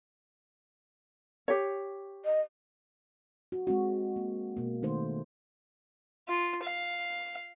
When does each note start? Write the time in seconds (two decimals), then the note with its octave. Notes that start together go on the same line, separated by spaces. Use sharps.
1.48 G4 C#5
2.25 D#5
3.52 F#4
3.67 G#3 C4 F#4
4.16 A#3
4.57 B2 A#3
4.83 D#3 A3 C5
6.28 F4
6.63 F5